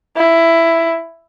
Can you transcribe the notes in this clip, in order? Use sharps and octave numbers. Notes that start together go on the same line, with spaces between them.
E4